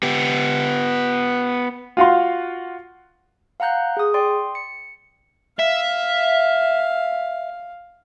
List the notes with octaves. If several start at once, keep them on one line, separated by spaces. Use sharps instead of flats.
B3 G4
F4 F#4 F5 C6
F5 F#5 A#5 F#6 G6
G#4 D#6
D5 G5 C6
C#7
E5 F5